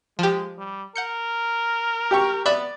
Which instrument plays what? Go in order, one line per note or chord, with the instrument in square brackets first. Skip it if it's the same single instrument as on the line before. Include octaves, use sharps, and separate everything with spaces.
[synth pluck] F3 G4 [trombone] G#3
[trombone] G3
[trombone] A#4 [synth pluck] F#5 G6 C#7
[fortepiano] G4 G5 C#6
[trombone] B3 [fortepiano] D5 [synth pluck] E5 B5 F#6